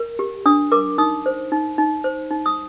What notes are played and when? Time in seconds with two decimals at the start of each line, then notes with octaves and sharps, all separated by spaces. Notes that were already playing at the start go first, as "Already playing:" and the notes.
Already playing: A#4
0.19 G4
0.46 D4 D#6
0.72 A#4 D6
0.98 D#4 D#6
1.26 C5
1.52 D#4
1.78 D#4
2.04 C5
2.31 D#4
2.46 D#6